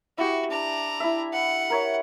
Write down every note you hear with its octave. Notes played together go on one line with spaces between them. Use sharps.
E4 F#4 G4
D4 A#5
E4 E5
F#5
A#4 C#5 E5